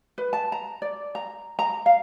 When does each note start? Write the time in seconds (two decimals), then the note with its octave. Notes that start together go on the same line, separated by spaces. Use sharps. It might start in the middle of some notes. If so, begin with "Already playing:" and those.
0.18 B4
0.33 A5
0.52 A#5
0.82 D5
1.15 A#5
1.59 A#5
1.86 F5